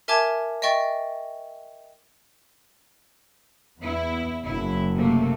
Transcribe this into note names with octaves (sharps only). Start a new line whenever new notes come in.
A#4 E5 G#5 A5 D6 G#6
D#5 E5 G5 C#6 A6
E2 B3 E4
F#1 F#3 E4
C3 A3 A#3